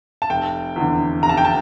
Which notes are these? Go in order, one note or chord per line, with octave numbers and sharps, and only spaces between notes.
A5
F1 G5
E2 D3
F1 A#5
A5
G5
A5